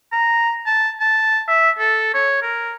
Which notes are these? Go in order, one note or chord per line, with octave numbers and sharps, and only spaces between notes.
A#5
A5
A5
E5
A4
C#5
A#4